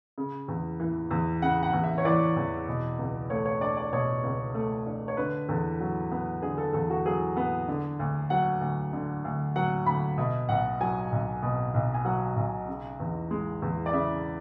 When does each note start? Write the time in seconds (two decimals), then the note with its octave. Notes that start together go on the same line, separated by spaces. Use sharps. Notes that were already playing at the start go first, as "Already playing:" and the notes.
0.18 C#3
0.48 E2
0.80 E3
1.11 E2
1.42 C#3 F#5
1.63 F#5
1.73 E2
1.84 E5
1.98 C#5
2.05 E3 D5
2.36 E2
2.68 B2
2.99 C#2
3.30 A3 C#5
3.46 C#5
3.61 D4 D5
3.77 D5
3.93 B2 C#5
4.24 C#2
4.54 A3
4.86 D4
5.08 C#5
5.17 D3 B4
5.49 E2 A4
5.80 F#3
6.12 B3
6.42 D3 G#4
6.58 A4
6.73 E2 A4
6.90 F#4
7.06 F#3 G#4
7.37 B3
7.68 D3
7.99 D2
8.30 F#3 F#5
8.61 D2
8.93 D3
9.25 D2
9.56 F#3 F#5
9.86 D2 B5
10.18 B2 E5
10.49 B1 F#5
10.80 F#3 G#5
11.12 B1
11.43 B2
11.74 B1
11.94 G#5
12.05 F#3 F#5
12.36 B1
12.68 C#3
13.00 E2
13.31 G#3
13.62 E2
13.86 D5
13.93 C#3 E5